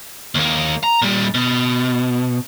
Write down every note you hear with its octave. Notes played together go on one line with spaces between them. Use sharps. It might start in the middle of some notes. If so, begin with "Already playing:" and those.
D#2 A#3
A#5
A#2 G3
B2